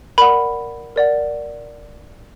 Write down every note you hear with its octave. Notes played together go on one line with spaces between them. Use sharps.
A#4 D5 F#5 B5
A#4 D5 F#5